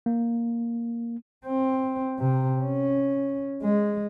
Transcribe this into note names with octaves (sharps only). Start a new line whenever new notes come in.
A#3
C4
C3
C#4
G#3